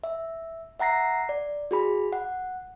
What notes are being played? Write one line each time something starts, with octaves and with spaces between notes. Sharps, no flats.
E5
E5 F#5 A#5 A#6 C7
D5
F#4 G#4 B5
F#5